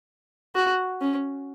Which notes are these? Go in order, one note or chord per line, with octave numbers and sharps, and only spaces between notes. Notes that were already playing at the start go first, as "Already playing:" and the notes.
F#4
C#4